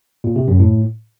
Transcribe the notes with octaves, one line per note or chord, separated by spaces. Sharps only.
A#2
C3
F#2
A2